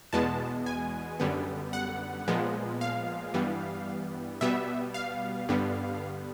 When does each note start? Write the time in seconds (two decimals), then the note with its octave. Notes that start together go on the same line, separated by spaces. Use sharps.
0.13 E2 B2 G#3 B3 A5
0.66 G#5
1.20 F#2 D3 G3 B3
1.73 F#5
2.28 A#2 F3 G#3 B3
2.81 F5
3.34 G2 E3 G3 B3
4.41 B2 G3 B3 E5
4.94 F5
5.49 G2 D3 G3 B3